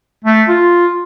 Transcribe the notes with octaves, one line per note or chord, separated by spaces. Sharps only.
A3
F4